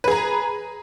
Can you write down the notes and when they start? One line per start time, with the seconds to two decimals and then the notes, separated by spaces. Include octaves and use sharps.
0.04 B4
0.08 G#4
0.11 A#5